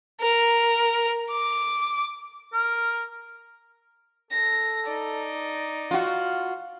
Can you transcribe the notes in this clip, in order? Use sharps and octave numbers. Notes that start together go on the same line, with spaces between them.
A#4
D6
A#4
A4 A#6
D#4 D5
F4 F#4 F5